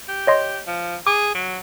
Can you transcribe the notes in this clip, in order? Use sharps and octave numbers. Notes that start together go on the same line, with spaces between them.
G4
C#5 D#5 C6
F3
G#4 D6
F#3